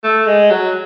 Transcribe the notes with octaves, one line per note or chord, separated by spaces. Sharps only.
A3
G#3
F#3